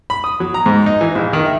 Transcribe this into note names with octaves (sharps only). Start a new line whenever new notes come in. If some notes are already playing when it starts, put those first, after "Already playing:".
B5
D#6
F#3
A#5
G#2
D#4
E3
A#1
D#3
E5